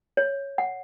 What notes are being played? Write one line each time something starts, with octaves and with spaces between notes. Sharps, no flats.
C#5
F#5